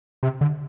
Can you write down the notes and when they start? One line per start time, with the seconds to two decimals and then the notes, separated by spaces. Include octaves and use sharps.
0.23 C3
0.41 D3